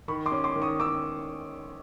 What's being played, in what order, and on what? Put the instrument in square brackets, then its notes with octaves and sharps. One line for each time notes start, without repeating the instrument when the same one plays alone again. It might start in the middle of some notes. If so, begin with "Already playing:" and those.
[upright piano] D#3 B5 C#6
C6 D6
C#4
C6 D6
D#3
C#6 D#6
C#4 D6 E6